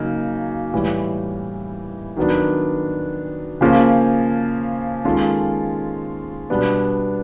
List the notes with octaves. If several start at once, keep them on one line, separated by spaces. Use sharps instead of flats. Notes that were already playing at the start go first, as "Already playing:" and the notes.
Already playing: C#3 F#3 A#3 D#4
A2 E3 G3
D#3 F#3 B3 D4
C#3 F3 A#3 C#4 F4
D#3 G#3 C#4 F4 A4
B2 G3 B3 D4